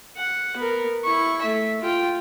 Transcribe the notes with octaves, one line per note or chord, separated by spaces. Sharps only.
F#5
B3 A#4
E4 C#6
A3 E5
F4 G5